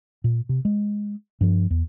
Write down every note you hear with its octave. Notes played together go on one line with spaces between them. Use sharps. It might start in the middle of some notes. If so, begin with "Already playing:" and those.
A#2
C3
G#3
G2 F3
E2